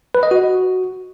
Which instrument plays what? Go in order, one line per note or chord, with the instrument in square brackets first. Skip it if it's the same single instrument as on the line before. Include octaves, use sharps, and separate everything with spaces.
[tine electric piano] B4
D#5
F#4